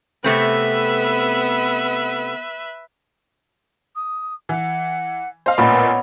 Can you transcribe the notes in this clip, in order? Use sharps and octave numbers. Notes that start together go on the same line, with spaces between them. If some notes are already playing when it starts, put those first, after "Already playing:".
C3 A3 B3 C4 B4 E5
D#6
E3 F#5
C5 D#5 F5
A1 A#2 B3 B4 C#5 A#5